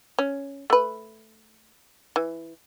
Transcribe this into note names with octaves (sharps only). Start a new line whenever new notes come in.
C#4
A3 B4
E3